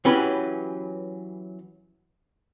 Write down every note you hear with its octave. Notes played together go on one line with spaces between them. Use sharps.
E3 F#3 C#4 G4 B4